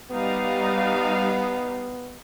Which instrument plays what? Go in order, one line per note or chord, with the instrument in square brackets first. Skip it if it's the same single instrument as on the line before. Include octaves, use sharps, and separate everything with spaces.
[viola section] G3 D#4 F5 [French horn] B3